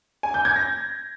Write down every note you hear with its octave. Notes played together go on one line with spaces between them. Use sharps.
G#5
G6
G#6
A#6